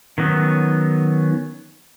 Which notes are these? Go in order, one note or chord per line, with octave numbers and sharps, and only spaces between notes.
D#3 F#3 B3 C#4